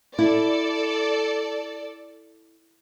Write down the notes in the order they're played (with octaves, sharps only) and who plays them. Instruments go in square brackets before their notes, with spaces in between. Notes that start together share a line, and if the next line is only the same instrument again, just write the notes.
[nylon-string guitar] E4 [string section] A4 D5